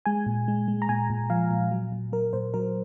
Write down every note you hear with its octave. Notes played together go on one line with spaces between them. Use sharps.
G#3 G#5
A#2
G#3
G#3
A#5
A#2 G#5
A#2
F3 F5
A#2
F#3
A#2
F#3 A#4
A#2 C5
F#3 A#4